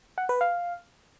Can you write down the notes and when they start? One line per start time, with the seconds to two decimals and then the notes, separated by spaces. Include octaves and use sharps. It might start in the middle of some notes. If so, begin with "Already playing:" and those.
0.18 F#5
0.29 B4
0.41 F5